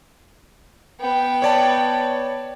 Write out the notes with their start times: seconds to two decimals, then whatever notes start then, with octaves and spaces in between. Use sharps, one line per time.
1.00 B3 G5
1.42 C#5 D5 A5